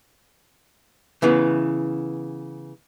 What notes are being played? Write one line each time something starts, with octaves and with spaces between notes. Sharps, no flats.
C#3 E3 B3